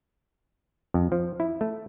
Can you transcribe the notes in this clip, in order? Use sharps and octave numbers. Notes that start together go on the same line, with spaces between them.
F2
F3
E4
A3